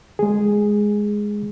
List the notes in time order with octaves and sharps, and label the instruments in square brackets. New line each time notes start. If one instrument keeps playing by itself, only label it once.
[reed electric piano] G#3 G#4